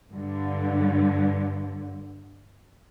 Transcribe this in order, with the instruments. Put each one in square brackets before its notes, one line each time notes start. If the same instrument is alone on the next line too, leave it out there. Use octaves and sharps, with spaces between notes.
[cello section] G2 D3